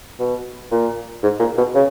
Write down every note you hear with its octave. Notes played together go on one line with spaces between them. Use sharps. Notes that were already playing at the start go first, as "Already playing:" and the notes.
B2
A#2
G#2
A#2
B2
C#3